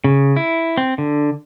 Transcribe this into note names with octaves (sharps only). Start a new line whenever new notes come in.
C#3
E4
C4
D3